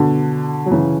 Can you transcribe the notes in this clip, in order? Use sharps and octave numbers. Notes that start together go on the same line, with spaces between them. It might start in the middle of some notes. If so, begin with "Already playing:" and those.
Already playing: B2 D3
F#3
C#3 E3